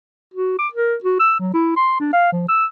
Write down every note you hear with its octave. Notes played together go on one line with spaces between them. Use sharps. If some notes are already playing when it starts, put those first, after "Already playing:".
F#4
D6
A#4
F#4
E6
F#3
E4
C6
D4
F5
F3
E6